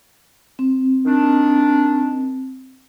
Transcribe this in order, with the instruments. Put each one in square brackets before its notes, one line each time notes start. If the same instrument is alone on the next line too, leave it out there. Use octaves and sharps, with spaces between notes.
[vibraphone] C4
[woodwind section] D#3 D4